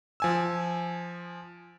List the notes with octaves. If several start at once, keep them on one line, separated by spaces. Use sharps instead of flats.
F3 G#5 E6